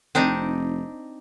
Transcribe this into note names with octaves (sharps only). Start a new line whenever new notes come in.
F1 C4 D4 D#4